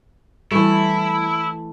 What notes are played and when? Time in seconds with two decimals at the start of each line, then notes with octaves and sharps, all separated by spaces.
0.52 E3 G3 A3 E4